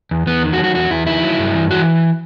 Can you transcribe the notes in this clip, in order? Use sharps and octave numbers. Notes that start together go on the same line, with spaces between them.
E2
E2 B3
D#3
F#4
F#3
F#4
E2 F#4
E2 E4
D#3 E4
F#3
G2
E3
E3 F#4